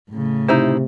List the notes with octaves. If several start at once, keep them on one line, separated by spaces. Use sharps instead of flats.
A2 C#3
C3 D#4 E4 C5